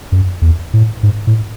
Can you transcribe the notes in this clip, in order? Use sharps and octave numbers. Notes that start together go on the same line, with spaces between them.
F#2
E2
A2
G#2
A2